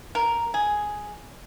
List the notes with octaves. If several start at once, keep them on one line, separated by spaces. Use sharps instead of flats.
A#4
G#4